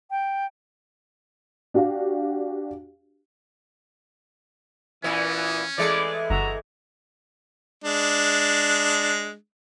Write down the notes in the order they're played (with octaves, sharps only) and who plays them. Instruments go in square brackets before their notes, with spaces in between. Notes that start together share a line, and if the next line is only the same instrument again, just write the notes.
[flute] G5
[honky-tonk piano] D4 F#4 G4 F5
[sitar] A#2 B3 [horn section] E3 [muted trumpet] C#4
[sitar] E3 G#3 A3 [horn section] D5
[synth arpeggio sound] G1 [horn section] F#4 E5 A#5
[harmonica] G#3 D4